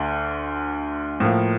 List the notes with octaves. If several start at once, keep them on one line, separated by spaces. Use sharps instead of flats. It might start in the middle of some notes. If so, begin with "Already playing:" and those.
Already playing: D2 D3
A2 F3 A#3